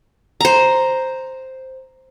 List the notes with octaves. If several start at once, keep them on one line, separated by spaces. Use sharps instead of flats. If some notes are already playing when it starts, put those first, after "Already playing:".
C5 A#5